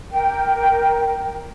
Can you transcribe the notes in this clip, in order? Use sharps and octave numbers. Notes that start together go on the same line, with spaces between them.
A#4 G5